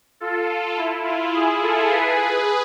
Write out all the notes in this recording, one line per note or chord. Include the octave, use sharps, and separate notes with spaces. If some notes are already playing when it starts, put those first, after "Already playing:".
F4 A4
F4
E4
F4
E4 G#4
F4 A4
G#4 B4